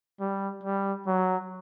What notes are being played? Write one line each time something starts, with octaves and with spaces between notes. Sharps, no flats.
G3
G3
F#3